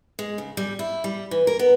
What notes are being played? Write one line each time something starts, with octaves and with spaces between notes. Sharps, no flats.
G#3
C#3
G3
E4
G3
E3
A#4
B3